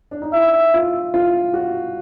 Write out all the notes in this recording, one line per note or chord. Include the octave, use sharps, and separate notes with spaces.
D4
D#4
E4 E5
F4
F4
F#4